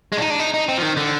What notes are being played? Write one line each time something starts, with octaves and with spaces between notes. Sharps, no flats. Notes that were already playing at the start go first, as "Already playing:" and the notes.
G#3
D4
D#4
D4
D#4
D#4
C4
F3
D#3
D3